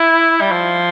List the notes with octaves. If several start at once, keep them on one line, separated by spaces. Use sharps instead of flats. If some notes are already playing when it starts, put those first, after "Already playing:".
Already playing: E4
G3
F3